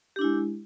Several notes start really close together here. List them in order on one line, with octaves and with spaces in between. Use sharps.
G4 D4 E4 G#3